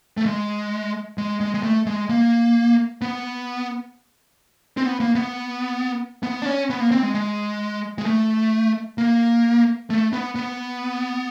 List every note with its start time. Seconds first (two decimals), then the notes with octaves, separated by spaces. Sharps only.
0.17 A3
0.26 G#3
1.18 G#3
1.41 G#3
1.54 G#3
1.63 A3
1.86 G#3
2.09 A#3
3.02 B3
4.77 C4
4.85 B3
5.00 A#3
5.15 B3
6.23 B3
6.42 D4
6.46 C#4
6.70 B3
6.80 A#3
6.91 C4
7.03 G#3
7.15 G#3
7.98 G#3
8.06 A3
8.98 A#3
9.90 A3
10.13 B3
10.35 B3